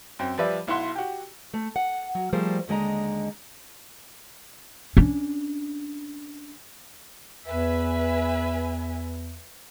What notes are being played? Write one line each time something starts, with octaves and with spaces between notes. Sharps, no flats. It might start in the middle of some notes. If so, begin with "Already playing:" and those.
F#2 C4
F3 G3 B4 D5 E5
B1 E4 F#5 C6
F#4 G4
A3
F#5
F#3
F3 G3 A3 G#4 A#4 C5
D#2 D3 G#3 D#5 A#5
C#4 D4
E2 B4 E5 G#5